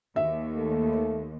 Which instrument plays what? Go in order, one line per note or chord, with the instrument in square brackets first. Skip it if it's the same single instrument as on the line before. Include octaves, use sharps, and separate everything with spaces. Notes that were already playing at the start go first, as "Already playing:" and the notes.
[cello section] D#2 [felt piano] E5
[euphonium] A3